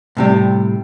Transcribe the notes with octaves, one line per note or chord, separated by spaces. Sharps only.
A2 C3 G3